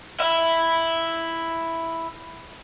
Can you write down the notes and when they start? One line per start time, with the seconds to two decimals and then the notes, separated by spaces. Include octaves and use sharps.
0.20 E4 E5